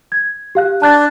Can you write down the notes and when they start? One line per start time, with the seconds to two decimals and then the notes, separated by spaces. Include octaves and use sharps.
0.12 G#6
0.55 G4 F5 F#6
0.82 D4 A5 F#6 A6